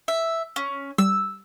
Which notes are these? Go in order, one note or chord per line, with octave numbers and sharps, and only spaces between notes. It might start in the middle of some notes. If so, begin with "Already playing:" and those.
E5
C#4
G3 E6